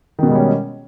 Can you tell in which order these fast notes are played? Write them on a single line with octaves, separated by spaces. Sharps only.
D#3 B2 G#3 G3 C#4